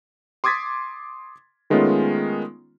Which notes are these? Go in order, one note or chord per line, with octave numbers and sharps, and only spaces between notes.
C6 D6 D#6 G#6 A6 B6
D#3 G#3 A3 B3 C#4 F4